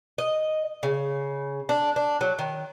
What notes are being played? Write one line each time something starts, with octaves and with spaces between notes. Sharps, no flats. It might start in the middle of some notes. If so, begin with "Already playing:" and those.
D#5
C#3
D4
D4
F#3
D#3